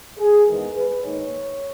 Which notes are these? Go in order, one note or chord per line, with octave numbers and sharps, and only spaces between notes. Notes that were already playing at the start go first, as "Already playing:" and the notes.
G#4
E2 D#3 G#3 B3 A#4
B4
G#2 D#3 A#3 C#5